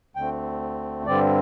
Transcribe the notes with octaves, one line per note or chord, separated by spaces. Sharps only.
D2 D3 A3 C4 G5
G2 D3 G3 C4 D5